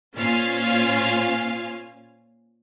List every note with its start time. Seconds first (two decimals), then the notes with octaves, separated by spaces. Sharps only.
0.15 A#2 C#4 F4 C5 F5 G#5